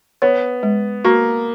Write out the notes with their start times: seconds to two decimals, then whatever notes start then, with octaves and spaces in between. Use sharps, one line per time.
0.22 B3 C#5
0.63 G#3
1.05 A#3 F#4